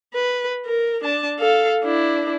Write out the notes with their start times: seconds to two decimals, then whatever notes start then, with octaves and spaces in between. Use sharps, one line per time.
0.14 B4
0.66 A#4
1.04 D4 A5
1.40 A4 F5
1.84 D4 E4